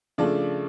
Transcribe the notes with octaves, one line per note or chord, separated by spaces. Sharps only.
C#3 F3 A3 D4 D5